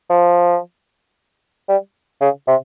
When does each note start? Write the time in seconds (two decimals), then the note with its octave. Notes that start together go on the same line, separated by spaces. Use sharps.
0.10 F3
1.69 G3
2.21 C#3
2.48 C3